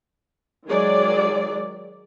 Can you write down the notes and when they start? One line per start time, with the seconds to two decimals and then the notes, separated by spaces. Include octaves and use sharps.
0.67 D#3 F#3 G#3 G#4 D5